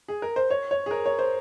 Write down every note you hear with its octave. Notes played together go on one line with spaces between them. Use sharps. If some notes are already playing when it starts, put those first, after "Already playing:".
G#4
A#4
C5
C#5
C#5
G#4
A#4
C#5
C5